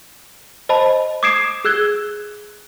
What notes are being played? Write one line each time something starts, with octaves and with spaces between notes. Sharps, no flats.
C5 D#5 A5 B5
D6 D#6 G#6 C7 D7 E7
G#4 E6 F#6 G#6 G7